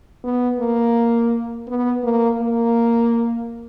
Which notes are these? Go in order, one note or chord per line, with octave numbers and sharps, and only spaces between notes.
B3
A#3
B3
A#3
A#3